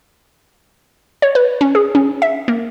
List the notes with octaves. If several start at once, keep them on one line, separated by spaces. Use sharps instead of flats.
C#5
B4
C#4
G#4
C#4
E5
A#3